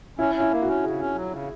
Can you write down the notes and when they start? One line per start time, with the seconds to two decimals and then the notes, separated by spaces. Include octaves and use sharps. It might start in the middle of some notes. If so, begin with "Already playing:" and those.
0.19 C#4 E4
0.35 C#4
0.40 E4
0.51 A#3
0.62 F#4
0.68 C#4
0.84 C#3 G#4
0.99 C#4
1.16 F#3
1.32 C#3